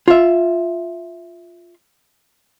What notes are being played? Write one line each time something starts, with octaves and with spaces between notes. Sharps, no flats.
F4 E5